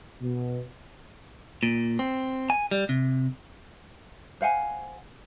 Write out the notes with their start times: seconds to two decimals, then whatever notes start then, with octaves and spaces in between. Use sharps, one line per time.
0.21 B2
1.63 A#2
1.99 C4
2.50 G#5
2.71 G3
2.89 C3
4.41 C5 F5 F#5 G#5